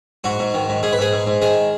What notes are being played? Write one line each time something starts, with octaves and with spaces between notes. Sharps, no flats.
G#2 F#4
G#2
D#3
G#2
G#2 G#4
B4
G#2 G#4
G#2
G#2
D#3 G#4